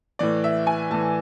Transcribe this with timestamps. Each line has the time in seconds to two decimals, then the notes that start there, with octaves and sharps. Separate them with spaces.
0.19 A2 E3 D5
0.44 E5
0.67 G#5
0.90 A2 E3 A5